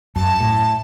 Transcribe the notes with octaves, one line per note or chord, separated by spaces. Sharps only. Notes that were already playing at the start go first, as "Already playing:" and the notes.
F#2 A5
A2